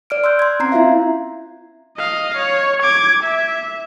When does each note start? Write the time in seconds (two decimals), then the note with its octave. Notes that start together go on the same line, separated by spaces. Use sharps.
0.10 D5 F6 D7
0.24 C6 E6 F#6 G6
0.39 C6 G#6
0.60 C4 C#4 A#5 G#6 C7
0.72 B3 E4 F4 E5 F5
1.97 D#5 F5
2.37 C#5
2.83 D6 G#6
3.23 E5